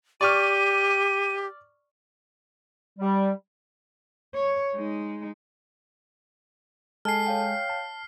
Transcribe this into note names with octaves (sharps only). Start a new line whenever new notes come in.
G4 D5 C#6 F6 D#7
G3
C#5
G#3 D#4
G#3 A4 G#5 A5 F6 C7
C#5 F5 G5
A5